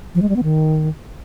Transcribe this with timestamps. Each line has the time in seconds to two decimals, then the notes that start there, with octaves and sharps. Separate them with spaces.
0.15 F3
0.22 G#3
0.29 G3
0.36 B3
0.43 D#3